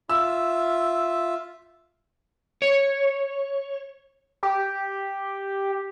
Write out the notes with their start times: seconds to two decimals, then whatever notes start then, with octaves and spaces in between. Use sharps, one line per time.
0.09 F4 E5 E6
2.62 C#5
4.43 G4